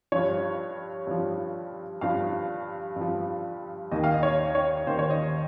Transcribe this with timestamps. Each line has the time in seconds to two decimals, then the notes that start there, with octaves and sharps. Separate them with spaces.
0.12 G2 F3 C#5
1.07 G2 F3
2.01 G2 F3 F5
2.96 G2 F3
3.91 D#2 D#3 D#5
4.04 F5
4.14 D#5
4.23 C#5
4.55 C#5
4.87 D#2 D#3 C5
4.99 C#5
5.10 D#5